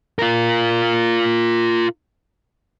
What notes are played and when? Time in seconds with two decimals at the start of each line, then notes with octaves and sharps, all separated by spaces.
0.19 F4 A#4